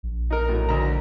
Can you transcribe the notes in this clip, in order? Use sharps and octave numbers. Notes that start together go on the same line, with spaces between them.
A#1
D#4 A#4
A2 F#3
D2 A#5